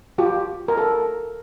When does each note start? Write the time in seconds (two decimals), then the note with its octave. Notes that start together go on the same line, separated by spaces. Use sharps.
0.18 F4 G4
0.68 A#4
0.77 A4